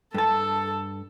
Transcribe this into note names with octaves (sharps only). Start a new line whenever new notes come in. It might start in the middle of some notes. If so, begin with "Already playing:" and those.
G2 A4 A5